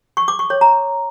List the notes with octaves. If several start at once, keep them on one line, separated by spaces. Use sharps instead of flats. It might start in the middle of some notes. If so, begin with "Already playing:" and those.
C#6
D6
C#6
C#5
A#5